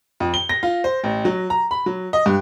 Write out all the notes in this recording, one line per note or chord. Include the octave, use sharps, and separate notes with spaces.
F2
G7
A#6
F4
C5
A1
F#3
A#5
B5
F#3
D#5
G2